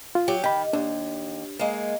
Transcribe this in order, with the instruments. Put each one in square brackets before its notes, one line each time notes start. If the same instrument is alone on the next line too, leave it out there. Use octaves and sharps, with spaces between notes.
[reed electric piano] F4
[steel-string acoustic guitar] F#3 G4
[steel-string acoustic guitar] D#3 [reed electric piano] G5 B5
[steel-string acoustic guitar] D#2 [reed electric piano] D4
[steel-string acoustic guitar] G#3 A#3